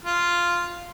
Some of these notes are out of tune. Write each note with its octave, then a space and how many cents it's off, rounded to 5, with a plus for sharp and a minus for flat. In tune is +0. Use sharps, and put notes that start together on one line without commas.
F4 -5